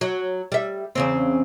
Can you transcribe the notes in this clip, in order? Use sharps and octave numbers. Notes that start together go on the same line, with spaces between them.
F#3
G3 E5
E2 C#3 C4